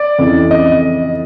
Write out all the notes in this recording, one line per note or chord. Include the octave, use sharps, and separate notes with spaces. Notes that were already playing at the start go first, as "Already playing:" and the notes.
Already playing: D5
F2 C#3 E3
D#5